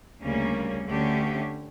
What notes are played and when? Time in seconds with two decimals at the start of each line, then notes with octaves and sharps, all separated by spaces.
0.22 D2 C#3 G3 A#3 C#4
0.86 D2 D3 A3 C#4 G4